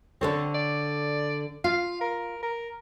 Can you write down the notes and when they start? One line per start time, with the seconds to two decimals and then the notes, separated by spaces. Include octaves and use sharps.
0.21 D3 C4 A4 C#5
0.54 D5
1.64 F4 F5
2.01 A#4
2.43 A#4